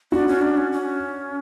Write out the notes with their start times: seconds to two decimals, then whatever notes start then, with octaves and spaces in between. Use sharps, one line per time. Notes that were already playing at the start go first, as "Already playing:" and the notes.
0.12 D4 F#4
0.28 C#4
0.42 D4
0.57 C#4
0.72 C#4